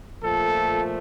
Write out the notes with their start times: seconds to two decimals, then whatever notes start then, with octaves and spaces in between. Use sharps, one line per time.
0.23 A#2 F3 A3 A4